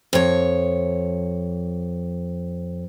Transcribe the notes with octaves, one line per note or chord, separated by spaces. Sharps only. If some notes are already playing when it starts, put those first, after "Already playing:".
F2 C#5